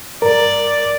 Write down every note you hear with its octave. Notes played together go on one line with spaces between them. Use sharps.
G2 A#4 D5